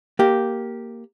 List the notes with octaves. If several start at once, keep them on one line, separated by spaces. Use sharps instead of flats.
A#3 G4